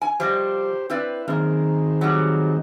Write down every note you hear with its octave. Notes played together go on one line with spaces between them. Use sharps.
G#5
F3 G3 G4 C5 D#5
C4 E4 B4 D5
F#2 D#3 G#3 A#3 C4
F#3 G3